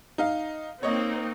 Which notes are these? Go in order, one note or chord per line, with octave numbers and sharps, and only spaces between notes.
D#4 F5
A#3 C4 D#4 C#5 D#5